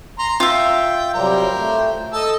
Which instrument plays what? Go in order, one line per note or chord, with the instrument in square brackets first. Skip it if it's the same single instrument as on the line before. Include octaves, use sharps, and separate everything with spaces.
[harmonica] A#5 C6
[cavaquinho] F4 E5 [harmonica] G5
[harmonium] C3 F#3 G3 [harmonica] G4 A#4 C5
[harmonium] A3
[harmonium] A4 [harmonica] D#5 A5 E6